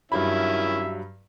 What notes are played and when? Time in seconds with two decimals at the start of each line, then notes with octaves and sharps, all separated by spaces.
0.12 G2 D#3 F#3 C#4 E4 E5 B5